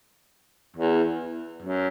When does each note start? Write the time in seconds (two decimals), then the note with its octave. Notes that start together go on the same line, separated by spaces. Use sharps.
0.76 E2
1.62 F#2